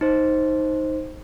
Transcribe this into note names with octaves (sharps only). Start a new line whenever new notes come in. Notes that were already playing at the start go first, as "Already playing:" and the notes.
D#4 C5